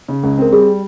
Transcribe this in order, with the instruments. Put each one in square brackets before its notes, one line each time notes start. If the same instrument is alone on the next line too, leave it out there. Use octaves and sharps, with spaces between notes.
[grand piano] C#3
C#2
[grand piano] C4 [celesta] A#4
[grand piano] G3 [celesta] G#4